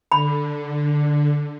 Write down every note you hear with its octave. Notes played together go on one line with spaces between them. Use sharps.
D3 B5